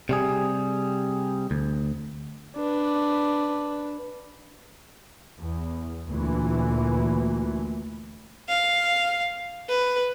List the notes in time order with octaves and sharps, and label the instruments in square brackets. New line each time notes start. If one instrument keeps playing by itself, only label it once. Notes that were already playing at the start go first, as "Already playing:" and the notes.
[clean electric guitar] C3 G3 G#4
D2
[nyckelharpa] D4 B4
[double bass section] E2
D2 A#2 E3
[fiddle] F5
B4